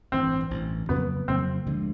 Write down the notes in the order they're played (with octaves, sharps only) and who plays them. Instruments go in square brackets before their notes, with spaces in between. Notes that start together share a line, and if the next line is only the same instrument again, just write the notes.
[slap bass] A1 G2 E3 [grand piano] C4
[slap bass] A1 G2 E3
[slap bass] F2 C#3 F#3 A#3 [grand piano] B3
[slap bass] F2 C#3 F#3 A#3 [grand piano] C4
[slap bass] D2 D3 F3 G#3